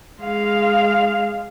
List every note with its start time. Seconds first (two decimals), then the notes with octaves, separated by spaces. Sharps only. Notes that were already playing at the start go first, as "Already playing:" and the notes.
0.21 G#3 F5